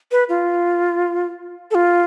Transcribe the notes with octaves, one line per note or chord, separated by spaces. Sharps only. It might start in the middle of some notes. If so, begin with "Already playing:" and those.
B4
F4
A4
F4